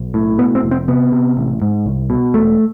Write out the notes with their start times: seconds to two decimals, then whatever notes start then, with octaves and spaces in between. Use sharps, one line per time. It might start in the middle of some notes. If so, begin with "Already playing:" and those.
Already playing: B1
0.14 A2
0.38 B2 B3
0.55 C4
0.63 F1
0.71 C4
0.88 C3 B3
1.12 C3
1.37 A1
1.62 G#2
1.86 C2
2.10 B2
2.34 E1 A3